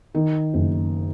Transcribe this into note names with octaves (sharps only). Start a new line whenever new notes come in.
D#3
F#1